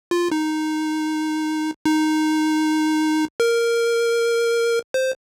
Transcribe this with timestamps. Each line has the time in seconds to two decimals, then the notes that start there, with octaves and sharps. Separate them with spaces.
0.11 F4
0.32 D#4
1.86 D#4
3.40 A#4
4.94 C5